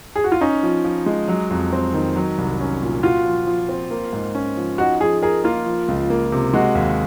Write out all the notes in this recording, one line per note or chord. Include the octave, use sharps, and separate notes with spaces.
G#4
F#4
F4
C#4 D#4
F3
F3
G#3
F#3
F2
C4
D#3
F#3
C2
C#4
A#2
F4 F#4
F3
F3
C4
A#3
G#2
C#4
F3
D#4 F#4
F3 G#4
G#4 A#4
A#3 F4
F3
C#2
A#3
C3
G#3 F#4
D#2